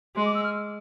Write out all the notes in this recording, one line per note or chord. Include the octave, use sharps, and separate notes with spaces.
G#3 C6
D6
E6
F6